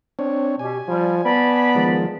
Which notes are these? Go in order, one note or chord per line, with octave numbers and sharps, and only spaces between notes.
C4 D4 C#5
B2 G4 G#5
F3 G3
B3 D5 A5 B5
D#3 F3 G#3